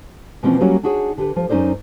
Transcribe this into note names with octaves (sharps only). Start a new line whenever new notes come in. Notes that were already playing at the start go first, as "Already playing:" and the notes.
B2 E3 F3 A#3 C4 C#4
F#3 G3 A#3 C#4 F#4 C#5
D4 D#4 F#4 G#4 C#5
D3 G4 B4
F3
F#2 C#4 D#4 A#4 C5 D5